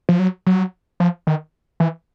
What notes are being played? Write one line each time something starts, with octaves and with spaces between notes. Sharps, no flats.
F3
F#3
F#3
F3
D#3
E3